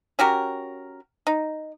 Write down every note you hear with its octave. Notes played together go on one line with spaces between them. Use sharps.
C#4 F#4 G4 A#4
D#4